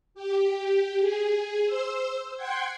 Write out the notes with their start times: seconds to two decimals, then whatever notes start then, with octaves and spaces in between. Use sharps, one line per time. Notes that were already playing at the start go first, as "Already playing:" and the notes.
0.14 G4
1.00 G#4
1.65 C5 E6
2.36 F#5 G5 C6 G#6